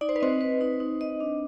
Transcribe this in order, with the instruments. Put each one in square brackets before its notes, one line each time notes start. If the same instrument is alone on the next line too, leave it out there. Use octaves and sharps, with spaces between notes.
[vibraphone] D#4 [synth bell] D5
[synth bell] C5
B4
[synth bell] C4 C5 [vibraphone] D#5
[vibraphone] B4
D#4
D#4
D#5
D4